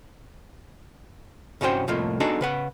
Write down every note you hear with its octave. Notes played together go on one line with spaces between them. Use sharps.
C2 G2 C#4 F#4 C5 G5
C2 F2 A2 A3 A#3 F4
B3 D4 D#4 F#4 G#4 A4
C#3 B4 F#5